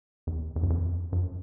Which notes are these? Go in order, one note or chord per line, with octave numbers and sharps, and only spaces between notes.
E2
E2
F#2
F2
F#2